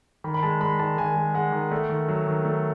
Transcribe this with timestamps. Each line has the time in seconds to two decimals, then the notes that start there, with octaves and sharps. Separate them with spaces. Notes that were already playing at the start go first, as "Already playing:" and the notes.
0.24 D#3 B5
0.34 B5
0.42 G#3 A5
0.61 G#3 B5
0.79 D#3 A5
0.97 D#3 G#5
1.16 G#3
1.34 G#3 F#5
1.53 D#3
1.71 A3
1.89 D#3
2.08 F#3
2.27 D#3
2.45 A3